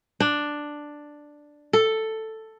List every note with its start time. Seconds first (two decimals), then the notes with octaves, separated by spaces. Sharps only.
0.20 D4
1.73 A4